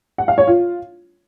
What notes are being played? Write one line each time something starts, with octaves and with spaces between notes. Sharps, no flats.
F#5
F5
C#5
F4